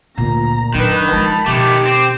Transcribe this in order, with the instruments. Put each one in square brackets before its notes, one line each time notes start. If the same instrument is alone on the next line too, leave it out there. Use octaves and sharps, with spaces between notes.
[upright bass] D2 [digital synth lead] A#2 [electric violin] A#5
[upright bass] F#2 [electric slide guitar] D#3 [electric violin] D4 B4
[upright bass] F3 G#3 [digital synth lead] A5 [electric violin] B5
[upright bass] B2 [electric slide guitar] D#3 A3 [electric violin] G4 [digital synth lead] D6
[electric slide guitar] C4